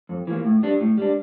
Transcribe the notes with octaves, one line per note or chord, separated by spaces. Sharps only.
F2
E3 A#3
A2
G3 D4
A2
G3 D4